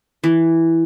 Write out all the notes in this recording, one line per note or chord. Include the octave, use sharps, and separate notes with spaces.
E3